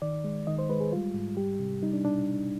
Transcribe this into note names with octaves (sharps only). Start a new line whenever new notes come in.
D#3 D5
G#3
D#3 D#5
C5
G#3 B4
G#4
G3 F4
G#2
G3 G4
C3
G3 D#4
D4
B2 D4